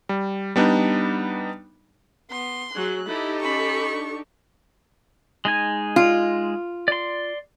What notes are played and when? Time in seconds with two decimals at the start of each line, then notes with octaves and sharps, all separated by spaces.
0.09 G3
0.56 G3 B3 D4 D#4
2.31 B3 C6
2.74 F#3 G#4 F#6
3.07 D#4 E4 G4 A4
3.42 C#4 B5 C#6
3.92 D4
5.45 G#3 D#4 G#5
5.96 F4
6.88 D5 C6